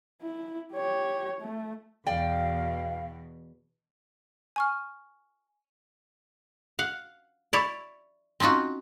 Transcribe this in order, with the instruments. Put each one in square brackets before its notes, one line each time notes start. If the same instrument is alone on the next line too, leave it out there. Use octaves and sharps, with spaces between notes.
[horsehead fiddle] E4
G4 C#5
A3
[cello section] E2 B2 [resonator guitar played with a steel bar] D5 G5 [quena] F5
[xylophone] G#5 C#6 F6
[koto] F5 F#5
E4 C#5 D5
C4 C#4 D#4 F4 F#4